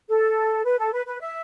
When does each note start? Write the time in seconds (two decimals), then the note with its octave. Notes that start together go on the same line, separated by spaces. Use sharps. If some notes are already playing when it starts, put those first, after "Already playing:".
0.09 A4
0.65 B4
0.78 A4
0.92 B4
1.06 B4
1.20 E5